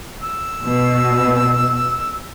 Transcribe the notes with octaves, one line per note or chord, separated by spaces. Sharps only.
E6
B2